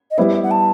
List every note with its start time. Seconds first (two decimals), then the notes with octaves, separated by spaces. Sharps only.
0.11 D#5
0.18 G3 B3 E4 B4 C5
0.34 E5
0.43 F#5
0.51 A5